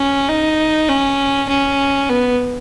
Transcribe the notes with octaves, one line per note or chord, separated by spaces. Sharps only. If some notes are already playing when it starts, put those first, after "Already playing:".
Already playing: C#4
D#4
C#4
C#4
B3